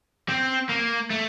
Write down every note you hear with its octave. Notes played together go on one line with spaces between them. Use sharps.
C4
A#3
A3